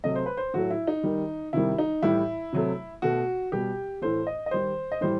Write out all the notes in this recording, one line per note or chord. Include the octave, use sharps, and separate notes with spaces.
C3 F#3 A3 D#5
C5
B4
C5
A2 F#3 A3 F#4
E4
D#4
D#3 G3
C3 D#3 G3 E4
D#4
A2 E3 G3 E4
C3 F#3 A3
B2 A3 F#4
B2 G3 G4
A2 E3 A3 C5
D#5
D#5
D#3 G3 C5
D#5
A2 E3 G3 C5